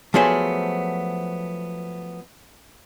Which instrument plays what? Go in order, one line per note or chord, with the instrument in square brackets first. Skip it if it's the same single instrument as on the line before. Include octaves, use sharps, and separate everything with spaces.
[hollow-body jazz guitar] F3 F#3 A3 B3 G#4 C5